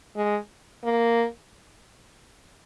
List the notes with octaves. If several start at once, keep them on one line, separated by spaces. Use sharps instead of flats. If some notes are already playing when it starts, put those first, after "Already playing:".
G#3
A#3